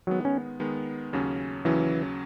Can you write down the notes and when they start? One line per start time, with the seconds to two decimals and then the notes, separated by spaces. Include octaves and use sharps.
0.07 D#3 F#3 G#3 B3
0.25 C#4
0.60 D#3 G#3 B3
1.13 D#2 C#3 F#3 C#4
1.65 D#2 C#3 E3 F#3 C#4